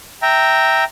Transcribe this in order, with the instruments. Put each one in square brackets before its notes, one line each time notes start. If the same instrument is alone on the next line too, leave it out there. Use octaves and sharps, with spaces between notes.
[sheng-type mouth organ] E5 G5 A#5